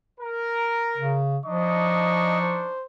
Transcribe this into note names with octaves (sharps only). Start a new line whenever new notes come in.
A#4
C#3
F3 D4 D#4 D#5 C#6
C5